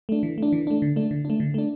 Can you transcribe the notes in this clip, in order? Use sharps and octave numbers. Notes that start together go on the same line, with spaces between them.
A3 D4
E3
A3 D4
E3
A3 D4
D3
A3 D4
D3
A3 D4
D3
A3 D4